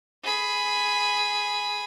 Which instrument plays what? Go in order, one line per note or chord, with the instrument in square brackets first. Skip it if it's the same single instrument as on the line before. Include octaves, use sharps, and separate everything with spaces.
[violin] G#4 B5